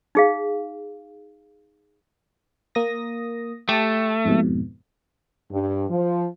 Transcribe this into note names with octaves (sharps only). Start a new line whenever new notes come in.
D#4 G#4 F5
A#3 D#6 A#6
A3 G4 A5
F2 G#2 B2
G2
F3